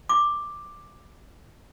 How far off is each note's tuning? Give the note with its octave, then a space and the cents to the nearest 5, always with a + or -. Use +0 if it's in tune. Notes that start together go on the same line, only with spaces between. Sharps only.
D6 +5